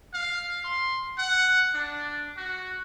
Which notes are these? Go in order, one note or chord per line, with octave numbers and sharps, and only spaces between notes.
F5
C6
F#5
D4
F#4